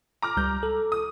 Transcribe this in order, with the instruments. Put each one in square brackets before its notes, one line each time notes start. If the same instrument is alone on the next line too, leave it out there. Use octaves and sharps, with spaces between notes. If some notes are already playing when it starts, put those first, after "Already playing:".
[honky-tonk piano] A#5 D6 F6
[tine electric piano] C#2 G3 G6
A4
[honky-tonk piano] D#6